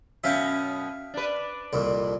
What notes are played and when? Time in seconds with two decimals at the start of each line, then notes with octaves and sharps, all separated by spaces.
0.24 F#2 B2 C#4 E5 F5 G5
1.14 D4 B4
1.73 C2 F2 A#2